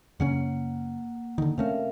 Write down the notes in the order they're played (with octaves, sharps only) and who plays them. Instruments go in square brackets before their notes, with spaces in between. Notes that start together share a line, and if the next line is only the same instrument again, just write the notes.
[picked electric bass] F#2 C#3 C#4 [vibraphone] A#3 F#5
[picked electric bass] D3 D#3
[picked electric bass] C3 A3 C#4 [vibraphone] A#4 E5 F5